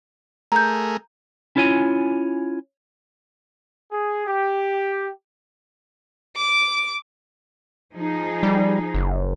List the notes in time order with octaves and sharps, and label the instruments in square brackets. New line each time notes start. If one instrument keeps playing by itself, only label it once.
[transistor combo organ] A3 G#4 A#4 [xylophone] A#5 G6
[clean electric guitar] C#4 E4 F4 C#5 G#5
[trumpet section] G#4
G4
[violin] D6 D7
[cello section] F3 D#4 G#4
[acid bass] G3
F#1